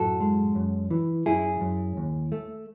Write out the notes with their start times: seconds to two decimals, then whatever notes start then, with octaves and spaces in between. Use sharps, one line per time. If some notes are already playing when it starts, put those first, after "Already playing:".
Already playing: F#2 A2 F#4 A4
0.20 G#3
0.55 F#2
0.91 E3
1.26 F#2 E4 G#4
1.61 F#2
1.97 D#2
2.32 A3